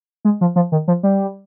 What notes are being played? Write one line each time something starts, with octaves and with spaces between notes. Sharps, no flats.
G#3
F3
F3
D#3
F3
G3